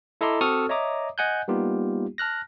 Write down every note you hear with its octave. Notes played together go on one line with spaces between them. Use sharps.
E4 A4 D#5 A#5 C6 D6
C4 F#4 A4 C#6 D#6 F6
C#5 D#5 E5 A#5 D6 D#6
D#5 F#5 G#5 F#6 G6
G3 A#3 B3 D#4 F4 G4
A5 F6 F#6 A#6